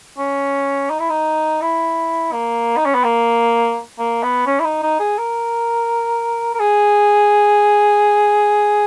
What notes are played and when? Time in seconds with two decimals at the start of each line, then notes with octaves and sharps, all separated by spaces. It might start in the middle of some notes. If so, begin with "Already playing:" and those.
0.18 C#4
0.90 D#4
1.00 E4
1.10 D#4
1.62 E4
2.32 A#3
2.77 D#4
2.85 C#4
2.94 B3
3.04 A#3
3.99 A#3
4.23 B3
4.46 C#4
4.60 E4
4.64 D#4
4.83 D#4
4.99 G#4
5.18 A#4
6.54 A#4
6.60 G#4